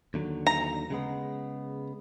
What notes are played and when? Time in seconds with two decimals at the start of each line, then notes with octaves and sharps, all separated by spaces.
0.14 D#2 D3 F#3
0.47 A#5
0.90 C#3 G#3 B3